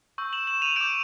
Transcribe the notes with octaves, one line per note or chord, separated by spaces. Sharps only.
C#6 E6 G6
E7 F#7
E7 F#7
D#7 F7
D6 G6 D7 E7